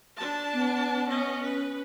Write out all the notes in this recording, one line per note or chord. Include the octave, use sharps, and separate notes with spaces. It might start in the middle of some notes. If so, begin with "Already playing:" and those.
D4 A5
B3
C#4 D#5
C#4 B4